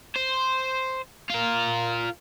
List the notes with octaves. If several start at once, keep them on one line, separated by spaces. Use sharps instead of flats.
C5
F4 A#4